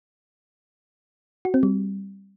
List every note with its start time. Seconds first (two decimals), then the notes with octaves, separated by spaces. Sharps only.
1.45 F#4
1.54 C4
1.63 G3